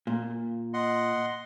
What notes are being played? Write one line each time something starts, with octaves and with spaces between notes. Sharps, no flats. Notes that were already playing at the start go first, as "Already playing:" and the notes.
A#2
D#5 F#5 C6